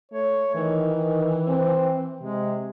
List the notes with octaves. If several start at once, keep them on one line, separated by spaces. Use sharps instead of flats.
A3 C#5
D#3 E3
D#3
C4
C3 G#3